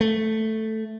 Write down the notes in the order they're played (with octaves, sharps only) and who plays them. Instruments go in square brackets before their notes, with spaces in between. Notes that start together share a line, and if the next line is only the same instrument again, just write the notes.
[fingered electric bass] A3